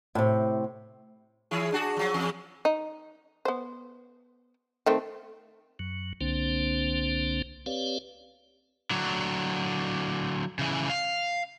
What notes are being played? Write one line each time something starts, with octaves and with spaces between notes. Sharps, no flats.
A2 C3
E3 E4 G#4
D4 F#4 G#4
F3 F#3
E2 G#4
D#4
B3 C5
D#3 A3 C4
F#2 F#3
C2 D3 A#3 C4 D4 C5
C4 G4 B4 C#5 D5 F5
D3 F#3
C#3 E3
F5